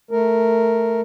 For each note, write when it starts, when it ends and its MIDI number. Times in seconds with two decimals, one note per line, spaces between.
0.11 1.01 57
0.11 1.01 70